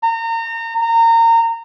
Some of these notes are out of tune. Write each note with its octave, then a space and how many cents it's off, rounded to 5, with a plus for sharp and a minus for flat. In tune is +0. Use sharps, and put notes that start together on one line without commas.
A#5 -30
A#5 -25